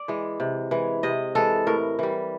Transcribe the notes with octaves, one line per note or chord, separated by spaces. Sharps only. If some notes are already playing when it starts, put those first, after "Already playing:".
Already playing: D5
E3 G#3
C3
E3 G#3
C3 D#5
E3 G#3 A4
A2 A#4
E3 G3